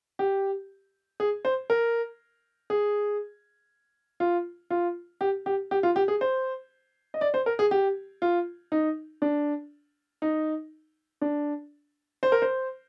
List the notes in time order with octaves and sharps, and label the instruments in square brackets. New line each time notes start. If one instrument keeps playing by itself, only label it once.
[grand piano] G4
G#4
C5
A#4
G#4
F4
F4
G4
G4
G4
F4
G4
G#4
C5
D#5
D5
C5
A#4
G#4
G4
F4
D#4
D4
D#4
D4
C5
A#4
C5